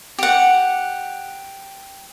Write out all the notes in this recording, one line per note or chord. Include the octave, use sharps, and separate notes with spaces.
G4 F#5